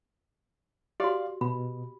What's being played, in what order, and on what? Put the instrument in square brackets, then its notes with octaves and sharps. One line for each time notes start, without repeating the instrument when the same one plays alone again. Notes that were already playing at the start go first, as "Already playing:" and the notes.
[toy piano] F#4 G4 [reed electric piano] D5 F5
[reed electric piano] B2 [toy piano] B5